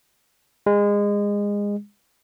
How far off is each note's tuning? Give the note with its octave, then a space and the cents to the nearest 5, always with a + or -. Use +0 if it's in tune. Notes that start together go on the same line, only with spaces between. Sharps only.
G#3 -25